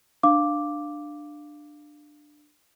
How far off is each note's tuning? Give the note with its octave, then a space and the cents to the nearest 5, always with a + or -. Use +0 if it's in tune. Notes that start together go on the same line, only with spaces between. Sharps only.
D4 +15 F5 +0 D6 +0